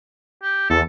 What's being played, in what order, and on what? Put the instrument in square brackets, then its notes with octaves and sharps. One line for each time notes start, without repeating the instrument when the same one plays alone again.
[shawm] G4
[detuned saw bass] E2 [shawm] A4